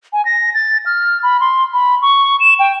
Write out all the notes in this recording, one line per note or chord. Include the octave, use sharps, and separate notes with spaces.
G#5
A#6
A6
F6
B5
C6
B5
C#6
E7
G5